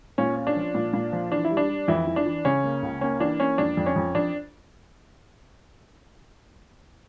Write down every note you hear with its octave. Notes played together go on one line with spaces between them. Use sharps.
A#2 C#4
C#4
D4
F3
A#2
A#2
F3
E3 D4
E4
G3
D4
G3
F2 E3 E4
E3
D4
E3
C#3 C#4
A#3
C#2
A#3 C#4
E3 D4
A#3 C#4
F2 D4
F2
C#4
F2
F2 D4